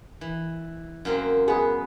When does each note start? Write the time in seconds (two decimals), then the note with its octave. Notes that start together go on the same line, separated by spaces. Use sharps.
0.21 E3
1.05 F#2 A#3 C4
1.48 B3 G#4 B4